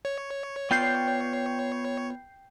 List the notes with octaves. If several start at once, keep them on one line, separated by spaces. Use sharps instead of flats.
C#5
B3 F4 D5 G5 G6 C7